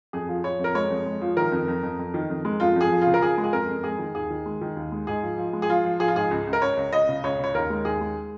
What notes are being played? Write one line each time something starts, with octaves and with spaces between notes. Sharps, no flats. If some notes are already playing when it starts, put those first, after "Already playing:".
F2 G#4
F3
F3 C#5
F2 A#4
G#3 C#5
F2
G#3
F3
D#3 A#4
F2
F2
F2
F2
D#3
F2
G#3
F2 F4
F2 G#4
F3
F4
C#3
A#4
F3 G#4
G#3
G#4
F2 A#4
F2
G#3 G#4
D#3
D#2 G#4
D#3
G#3
D#3
D#2
G#3
G#2 G#4
F3
F3
G#3
G#4
F3 F4
F3
F3 G#4
F4
G#2 G#4
C#2
C#2
A#4
C#2 C#5
C#2
C#2 D#5
C#3
C#2 C#5
C#3 C#5
D#2 A#4
G#3
D#2 G#4
G#3